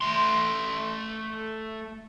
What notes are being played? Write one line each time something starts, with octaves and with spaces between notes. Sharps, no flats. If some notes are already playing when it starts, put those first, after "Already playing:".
A3 C6